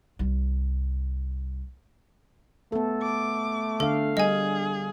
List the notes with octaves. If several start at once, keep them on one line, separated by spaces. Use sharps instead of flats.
C2 G3
A3 B3 A4
D6
D3 D4 A4 F5
G3 G#4 D#5 G#5